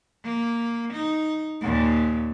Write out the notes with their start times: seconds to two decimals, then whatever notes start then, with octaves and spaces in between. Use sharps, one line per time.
0.24 A#3
0.93 D#4
1.62 D#2 A#2